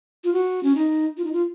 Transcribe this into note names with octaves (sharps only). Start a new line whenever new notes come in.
F4
F#4
C#4
D#4
F4
D#4
F4